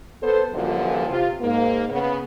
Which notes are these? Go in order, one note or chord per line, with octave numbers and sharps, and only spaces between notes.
B3 A4 C5
F#2 A#2 D3 E3 F3 G3
C3 F4
G#2 A#3
C#3 B3